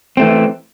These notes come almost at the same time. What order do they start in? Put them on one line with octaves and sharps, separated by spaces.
C4 A3 E3